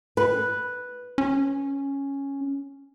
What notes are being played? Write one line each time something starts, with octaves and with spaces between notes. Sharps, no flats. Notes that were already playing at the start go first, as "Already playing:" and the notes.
B4
C#4